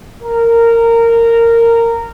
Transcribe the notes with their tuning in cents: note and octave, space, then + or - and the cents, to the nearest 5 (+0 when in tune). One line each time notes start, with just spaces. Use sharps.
A#4 -15